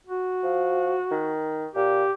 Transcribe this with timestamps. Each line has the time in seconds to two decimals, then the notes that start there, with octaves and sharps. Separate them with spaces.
0.06 F#4
0.43 F3
1.11 D#3
1.75 A#2 G4